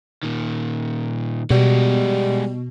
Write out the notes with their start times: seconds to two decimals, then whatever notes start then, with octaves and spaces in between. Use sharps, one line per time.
0.23 A#2 D#3
1.51 B2 G3 G#3 F#4